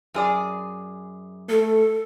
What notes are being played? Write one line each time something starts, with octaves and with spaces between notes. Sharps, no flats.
F#2 G#4 D5
A3 A4